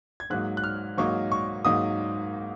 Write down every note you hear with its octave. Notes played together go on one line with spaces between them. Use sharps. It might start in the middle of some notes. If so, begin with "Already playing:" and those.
G#6
G#2 F#3 A#3 D#4 F#6
F#6
F6
G#2 F#3 A#3 D#4 C#6
C#6
G#2 F#3 A#3 D#4 D#6